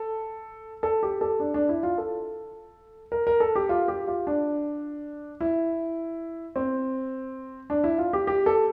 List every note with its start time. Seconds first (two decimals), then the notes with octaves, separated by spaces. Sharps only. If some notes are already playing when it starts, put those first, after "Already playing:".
Already playing: A4
0.83 A4
1.03 G4
1.21 A4
1.40 D4
1.54 D4
1.69 E4
1.83 F4
1.98 A4
3.12 A#4
3.27 A#4
3.40 A4
3.55 G4
3.69 F4
3.88 G4
4.07 F4
4.27 D4
5.41 E4
6.56 C4
7.70 D4
7.84 E4
7.98 F4
8.13 G4
8.27 G4
8.46 A4